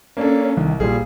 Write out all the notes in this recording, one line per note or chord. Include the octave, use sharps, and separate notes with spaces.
A#3 C#4 D4 A4
C2 D#3
A#1 A#2 G3 G#4